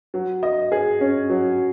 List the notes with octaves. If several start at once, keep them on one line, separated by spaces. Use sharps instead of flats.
F#3
D#5
G#4
C#4
F#3